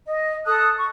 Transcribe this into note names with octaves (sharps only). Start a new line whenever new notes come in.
D#5
A4 A5 D#6 F#6
C#6